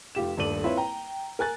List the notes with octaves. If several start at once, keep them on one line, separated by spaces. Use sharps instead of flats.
F1 F4 G4 E7
D#1 G2 A3 D5 D#7 F#7
C4 E4 F4 B4 C#5 E5
G5 A#5
A#4 G#5 F#6 A6